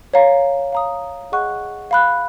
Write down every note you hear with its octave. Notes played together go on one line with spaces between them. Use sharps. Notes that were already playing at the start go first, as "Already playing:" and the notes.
C#5 F5 A#5
F5 A#5 D#6
G#4 D#5 F#5 C#6 F#6
F5 B5 F#6